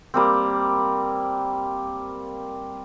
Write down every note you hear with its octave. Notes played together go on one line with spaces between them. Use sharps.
G3 A#3 C4